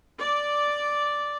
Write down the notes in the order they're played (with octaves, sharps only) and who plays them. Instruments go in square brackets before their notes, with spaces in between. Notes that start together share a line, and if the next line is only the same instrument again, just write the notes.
[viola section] D5